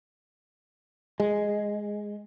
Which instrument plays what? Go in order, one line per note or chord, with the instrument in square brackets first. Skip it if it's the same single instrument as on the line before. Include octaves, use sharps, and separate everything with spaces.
[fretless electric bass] G#3